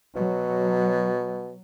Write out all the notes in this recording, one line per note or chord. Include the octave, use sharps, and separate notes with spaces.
B2 F#3